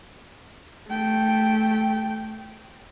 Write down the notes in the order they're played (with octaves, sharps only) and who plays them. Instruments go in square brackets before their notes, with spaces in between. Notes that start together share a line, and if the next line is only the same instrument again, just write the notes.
[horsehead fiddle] A3 G5